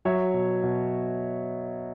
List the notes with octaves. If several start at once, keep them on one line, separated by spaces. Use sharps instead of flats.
F#3 C#5 E5
B2
B2